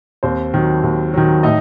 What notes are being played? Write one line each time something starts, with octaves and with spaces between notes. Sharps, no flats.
D#2 C4 C5
D#3 F#3
D#2
D#3 F#3
A2 D#4 D#5